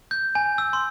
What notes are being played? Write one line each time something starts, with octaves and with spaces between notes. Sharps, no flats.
G6
G#5
E6
C6